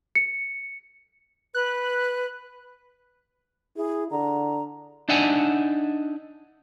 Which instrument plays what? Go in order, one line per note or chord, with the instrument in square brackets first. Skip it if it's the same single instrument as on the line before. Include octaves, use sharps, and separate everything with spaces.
[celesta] C#7
[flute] B4 [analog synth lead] F#6
[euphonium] E4 [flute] G#4
[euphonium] D3 [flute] A#5
[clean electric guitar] D4 D#4 D5 E5 F#5 G#5